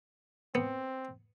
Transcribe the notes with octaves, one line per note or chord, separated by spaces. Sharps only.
B3 C4